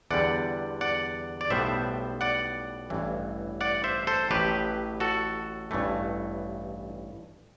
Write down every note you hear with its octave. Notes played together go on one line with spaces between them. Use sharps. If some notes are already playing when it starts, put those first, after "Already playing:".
E2 D3 G3 D5 F#5
D5 F#5
D5
B1 A2 G3 B3 C5 E5
D5 F#5
A1 G2 E3
D5 F#5
C5 E5
A4 C5
A1 A2 F#3 G4 B4
F#4 A4
A1 G2 E3 A3